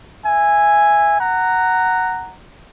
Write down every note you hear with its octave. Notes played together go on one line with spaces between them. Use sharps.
E5 G#5
F#5 A#5